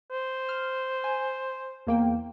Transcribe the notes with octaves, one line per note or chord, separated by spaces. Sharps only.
C5
F6
G#5
E2 A#3 G5